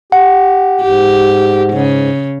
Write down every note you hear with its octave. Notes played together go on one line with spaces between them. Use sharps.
G4 F#5
G#2 G4
C#3